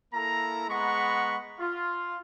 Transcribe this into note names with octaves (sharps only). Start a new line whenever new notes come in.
A#3 E4 A4 A#5
G#3 B3 F#5 A#5 B5 C#6
F4